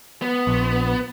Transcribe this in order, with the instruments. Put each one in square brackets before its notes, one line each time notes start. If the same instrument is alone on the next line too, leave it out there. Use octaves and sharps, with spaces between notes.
[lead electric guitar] B3
[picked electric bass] A#1